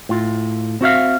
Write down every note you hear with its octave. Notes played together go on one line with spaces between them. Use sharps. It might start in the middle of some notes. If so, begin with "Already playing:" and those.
A2 F4
C4 F#4 E5 F5